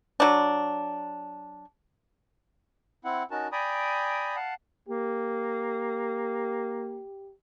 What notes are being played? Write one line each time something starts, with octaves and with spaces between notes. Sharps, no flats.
F#3 D4
C4 E4 F#5
C#4 D#4 F#4 A#4 A5
D5 G5 G#5 A#5 B5 D#6
F5 F#5 A5
A#3 G4